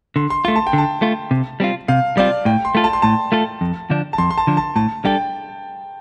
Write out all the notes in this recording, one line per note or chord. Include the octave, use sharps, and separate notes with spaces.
D3 C6
C6
A3 F4 C6
A5
G5
D3 A5
A3 F4
C3
G3 C4 F4
C3 F5
G3 C4 F4 D5
A2 G5
C6
A3 F4 A4
A5
C6
A2 A5
A3 F4 A4
F2
D3 F3 D4
A5
F2 C6
C6
A5
D3 F3 D4
A5
A2 A5
G3 D4 A4 G5